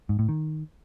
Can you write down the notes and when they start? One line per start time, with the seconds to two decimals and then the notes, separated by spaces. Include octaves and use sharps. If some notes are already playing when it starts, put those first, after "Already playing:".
0.09 G#2
0.19 A2
0.29 D#3